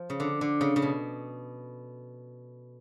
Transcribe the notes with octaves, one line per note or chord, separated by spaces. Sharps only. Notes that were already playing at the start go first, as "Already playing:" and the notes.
Already playing: F3
C#3
D3
D3
C#3
C#3
B2